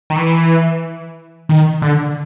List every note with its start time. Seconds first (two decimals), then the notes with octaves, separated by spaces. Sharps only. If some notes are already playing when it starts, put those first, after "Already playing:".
0.10 D#3
0.16 E3
1.49 D#3
1.82 D3